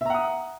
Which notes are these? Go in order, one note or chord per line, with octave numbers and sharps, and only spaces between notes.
E5 F#5 A#5 D#6